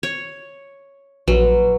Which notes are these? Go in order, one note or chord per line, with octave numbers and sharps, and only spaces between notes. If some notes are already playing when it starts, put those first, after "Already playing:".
C#5
A#1 F#3 B4